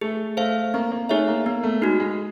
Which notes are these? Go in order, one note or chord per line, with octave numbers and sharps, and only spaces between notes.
A3 G#4
A3 C5 F5
A#3 C4
A#3
A3 D#4 G#4 C#5 E5
A#3
A#3 B3
A3
G#3 D#4 F#4
G#3